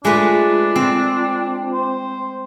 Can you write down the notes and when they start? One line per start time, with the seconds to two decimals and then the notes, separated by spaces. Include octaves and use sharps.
0.05 G#3 A3 D4 F4 B4
0.76 C4
1.73 C5